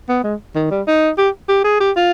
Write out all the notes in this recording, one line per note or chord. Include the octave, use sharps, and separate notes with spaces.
B3
G#3
D#3
G3
D#4
G4
G4
G#4
G4
F4